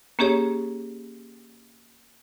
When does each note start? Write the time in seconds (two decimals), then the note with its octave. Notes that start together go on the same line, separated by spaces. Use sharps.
0.19 A#3 C#4 G4 G#4 C#5